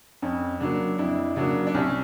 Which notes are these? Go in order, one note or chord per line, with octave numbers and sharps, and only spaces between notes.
F2 C#4
C#3 F#3 A#3 D4
F2 D4 E4
C#3 F#3 A#3 D4
D4
C2 C#4